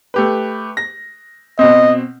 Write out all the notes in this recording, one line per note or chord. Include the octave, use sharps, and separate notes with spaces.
A3 G4 B4
A#6
B2 C4 D#5